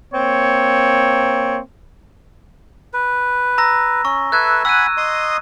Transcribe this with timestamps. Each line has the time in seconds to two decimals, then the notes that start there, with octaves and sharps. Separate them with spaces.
0.14 A#3 C4 C#5
2.94 B4
3.58 A#5 E6 A#6
4.05 C#4 C#6
4.32 A4 B4 E5 F#6 G#6
4.65 F#5 G#5 B5 E6 F#6 D#7
4.97 D#5 C6 D#6